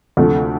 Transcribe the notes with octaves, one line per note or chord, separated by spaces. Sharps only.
D2 C3 F3 A3